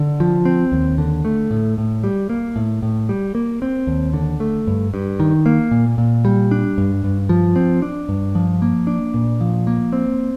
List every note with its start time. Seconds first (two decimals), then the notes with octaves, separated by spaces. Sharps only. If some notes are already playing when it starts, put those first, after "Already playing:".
Already playing: D3
0.20 F3
0.45 C4
0.72 D#2
0.98 D3
1.25 A3
1.51 A2
1.78 A2
2.04 G3
2.30 A#3
2.56 A2
2.82 A2
3.09 G3
3.35 A#3
3.62 C4
3.87 D#2
4.14 D3
4.40 A3
4.67 G2
4.94 G2
5.20 D#3
5.46 A#3
5.71 A#2
5.98 A#2
6.25 G3
6.51 D4
6.78 G2
7.04 G2
7.29 F3
7.56 C4
7.82 D4
8.09 G2
8.35 F3
8.62 A#3
8.87 D4
9.14 A#2
9.41 F3
9.67 A#3
9.93 C4